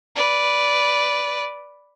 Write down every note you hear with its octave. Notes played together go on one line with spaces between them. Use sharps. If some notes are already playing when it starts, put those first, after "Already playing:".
B4 D5